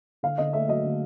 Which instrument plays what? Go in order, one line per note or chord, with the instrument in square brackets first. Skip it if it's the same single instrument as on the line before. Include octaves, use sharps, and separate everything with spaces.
[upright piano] D3 F5
D3 D#5
A3 E5
F#3 D#5
D3